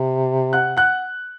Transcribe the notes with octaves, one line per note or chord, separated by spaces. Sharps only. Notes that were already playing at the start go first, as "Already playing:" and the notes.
Already playing: C3
F#5 F#6
F#5 F#6